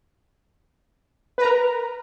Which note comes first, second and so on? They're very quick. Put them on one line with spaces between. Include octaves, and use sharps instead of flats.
B4 A#5 A#4